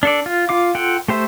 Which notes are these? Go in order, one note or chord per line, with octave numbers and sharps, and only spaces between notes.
D4 A4 D5
F4
F4 F5 D6
F4 A4 F#5 G5
A3 G4 C5 E5